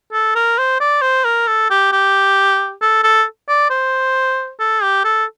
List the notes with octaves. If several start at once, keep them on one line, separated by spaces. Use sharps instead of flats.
A4
A#4
C5
D5
C5
A#4
A4
G4
G4
A4
A4
D5
C5
A4
G4
A4